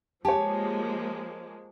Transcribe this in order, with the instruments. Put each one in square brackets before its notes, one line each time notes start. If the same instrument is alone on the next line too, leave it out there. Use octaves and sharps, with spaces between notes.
[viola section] F3 G#3 A#3 [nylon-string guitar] G4 [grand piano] C#5 G#5 [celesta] A5